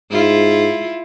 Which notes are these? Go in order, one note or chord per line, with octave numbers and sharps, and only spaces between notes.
G#2 E4 F4